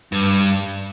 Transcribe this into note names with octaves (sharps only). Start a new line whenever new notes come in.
G2